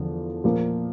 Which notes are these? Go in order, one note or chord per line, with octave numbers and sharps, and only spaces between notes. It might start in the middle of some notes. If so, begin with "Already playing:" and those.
Already playing: E2 D3 F3
A#2 F3 A#3